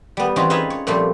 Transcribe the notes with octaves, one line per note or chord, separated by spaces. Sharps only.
G3 B3
E3 C4 C#4 D#4 F4 F#4
D#4 F4 G#4 B4 C#5 E5
C#5
A#2 F3 G3 A3 C4